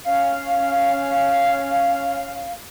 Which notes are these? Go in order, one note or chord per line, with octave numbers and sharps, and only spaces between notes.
C#4 F5